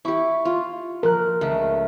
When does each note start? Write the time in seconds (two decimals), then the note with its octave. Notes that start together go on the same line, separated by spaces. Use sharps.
0.05 E4 G4 C#6
0.45 F4
1.03 F3 A#4 F#6
1.41 C#2 A3